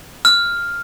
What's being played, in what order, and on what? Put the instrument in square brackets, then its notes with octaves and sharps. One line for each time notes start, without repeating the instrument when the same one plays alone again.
[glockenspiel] F6